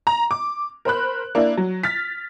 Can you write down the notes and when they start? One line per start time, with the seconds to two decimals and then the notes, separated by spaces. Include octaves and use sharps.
0.07 A#5
0.31 D6
0.85 A#4 C5 B5 F#6
1.35 A#3 D4 E4
1.57 F#3
1.83 F6 A6 B6